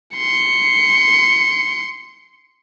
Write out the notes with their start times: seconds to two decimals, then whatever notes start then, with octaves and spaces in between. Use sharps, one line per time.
0.15 C6 C#7